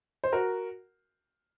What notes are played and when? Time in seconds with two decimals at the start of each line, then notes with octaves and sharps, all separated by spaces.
0.24 C5
0.33 F#4 A#4